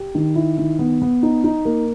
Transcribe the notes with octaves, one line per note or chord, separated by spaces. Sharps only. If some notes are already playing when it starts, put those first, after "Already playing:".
Already playing: G4
D#3
E4
D#3
B3
B3
D#4
D#4
A#3